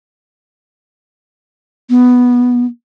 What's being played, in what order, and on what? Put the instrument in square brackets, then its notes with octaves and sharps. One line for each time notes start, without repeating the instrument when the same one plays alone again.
[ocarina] B3